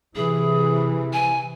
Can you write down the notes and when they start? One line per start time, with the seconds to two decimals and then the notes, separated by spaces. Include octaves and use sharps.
0.15 C3 E3 G#4
1.13 G#5